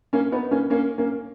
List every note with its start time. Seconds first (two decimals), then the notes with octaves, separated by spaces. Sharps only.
0.13 A#3 C#4
0.32 B3 D#4
0.51 A#3 C#4
0.70 A#3 C#4
0.98 A#3 C#4